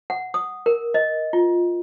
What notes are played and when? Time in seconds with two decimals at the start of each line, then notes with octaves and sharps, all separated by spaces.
0.10 F#5
0.34 D#6
0.66 A#4
0.94 D#5
1.33 F4